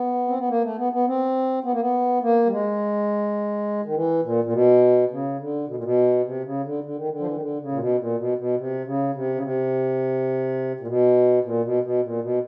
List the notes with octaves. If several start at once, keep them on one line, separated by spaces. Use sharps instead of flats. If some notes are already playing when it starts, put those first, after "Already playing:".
Already playing: B3
C4
B3
A#3
A3
B3
B3
C4
B3
A#3
B3
A#3
G3
G#3
D#3
E3
A#2
A#2
B2
C#3
D3
B2
A#2
B2
C3
C#3
D3
D3
D#3
D3
F3
E3
D#3
D3
C#3
A#2
B2
A#2
B2
B2
C3
C#3
C3
C#3
C3
A#2
B2
A#2
B2
B2
A#2
B2